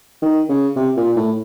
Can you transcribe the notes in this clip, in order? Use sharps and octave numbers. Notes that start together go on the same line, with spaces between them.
D#3
C#3
C3
A#2
A2